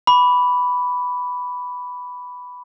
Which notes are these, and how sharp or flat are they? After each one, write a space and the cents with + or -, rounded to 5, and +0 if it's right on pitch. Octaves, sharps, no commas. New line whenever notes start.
B5 +0 D6 -30